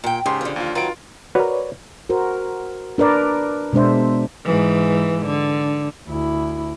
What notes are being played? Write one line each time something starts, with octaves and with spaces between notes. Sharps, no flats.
A#2 G5
G#2 C#3 G4 C6
D3 F3
D#2 F4
D#3 F#3 F4 B4 D7
F#4 A#4 B4 C#5 D5
F#4 A#4 C5
D4 A#4 B4 D5
B2 G#3 D4 C5 E5
G#2 E3
D3
D2 E4